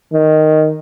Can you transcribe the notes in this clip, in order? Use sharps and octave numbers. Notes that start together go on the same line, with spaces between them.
D#3